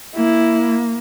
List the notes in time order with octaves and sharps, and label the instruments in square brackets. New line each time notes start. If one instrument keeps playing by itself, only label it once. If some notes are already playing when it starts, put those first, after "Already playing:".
[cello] A#3 [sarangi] E4